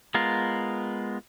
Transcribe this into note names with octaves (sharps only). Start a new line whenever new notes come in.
G#3 B3 F4 A#4